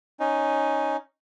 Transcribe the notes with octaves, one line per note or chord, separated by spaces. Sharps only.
C#4 D#4